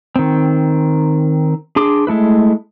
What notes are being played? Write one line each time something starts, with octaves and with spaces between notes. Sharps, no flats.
D#3 C4
D4 G#4 C6 D6
G#3 A3 E4 B4